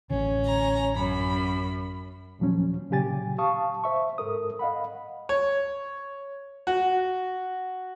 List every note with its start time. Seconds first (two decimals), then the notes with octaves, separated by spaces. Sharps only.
0.10 A1 D3 C#4
0.45 A#5
0.97 F#2 B5
2.39 D#2 A#2 F3 F#3 C#4
2.90 A#2 C#3 F#3 G4 G#5 A6
3.38 F5 A5 C#6 D#6
3.84 C5 E5 C#6
4.18 G#2 A4 A#4 D#6
4.59 D#5 F5 F#5 B5
5.29 C#5
6.67 F#4